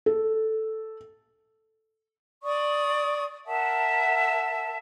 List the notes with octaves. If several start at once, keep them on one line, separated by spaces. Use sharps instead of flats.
A4
D5 C#6 D#6
A#4 E5 F#5 A5